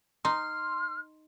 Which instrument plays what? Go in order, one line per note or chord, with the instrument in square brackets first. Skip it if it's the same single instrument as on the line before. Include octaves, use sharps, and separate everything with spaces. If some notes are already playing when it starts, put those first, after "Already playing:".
[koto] D#4 [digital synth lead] C6 [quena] F6